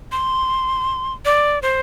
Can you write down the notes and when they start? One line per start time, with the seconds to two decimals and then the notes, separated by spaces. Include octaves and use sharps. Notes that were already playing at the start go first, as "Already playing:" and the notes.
0.12 C6
1.25 D5
1.62 C5